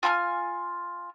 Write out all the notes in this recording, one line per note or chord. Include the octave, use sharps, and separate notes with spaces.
F4 G#5 C6 F6